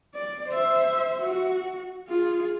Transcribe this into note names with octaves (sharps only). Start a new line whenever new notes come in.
D5
C5 E5
F#4
F4 G#4